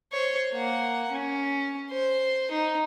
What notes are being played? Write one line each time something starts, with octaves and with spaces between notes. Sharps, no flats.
C5 C#5
A#3 F#5
C#4
C5
D#4